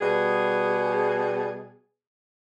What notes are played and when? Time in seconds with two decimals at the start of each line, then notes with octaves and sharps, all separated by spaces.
0.01 B2 G3 G#4